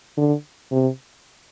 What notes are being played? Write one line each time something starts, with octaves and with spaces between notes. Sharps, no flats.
D3
C3